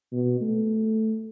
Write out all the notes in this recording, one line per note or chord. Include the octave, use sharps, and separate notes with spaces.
B2
A3